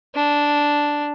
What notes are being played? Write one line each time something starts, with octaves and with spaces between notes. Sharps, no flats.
D4